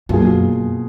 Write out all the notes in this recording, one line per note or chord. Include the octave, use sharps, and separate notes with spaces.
F#2 B2 A#3 F4 G#4